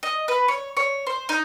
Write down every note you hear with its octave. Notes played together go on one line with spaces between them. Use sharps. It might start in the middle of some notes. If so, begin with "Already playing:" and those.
D#5
B4
C#5
C#5
C5
D#4